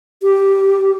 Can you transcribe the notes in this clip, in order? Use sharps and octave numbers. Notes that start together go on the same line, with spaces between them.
G4